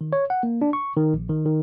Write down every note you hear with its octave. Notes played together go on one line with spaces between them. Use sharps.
D#3
C#5
F#5
A#3
D4
C#6
D#3
A#1
D#3
D#3